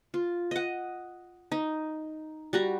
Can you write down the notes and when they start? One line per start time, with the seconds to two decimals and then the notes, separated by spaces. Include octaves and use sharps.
0.14 F4
0.51 D#5 F#5
1.52 D#4
2.53 G3 F#4 A#5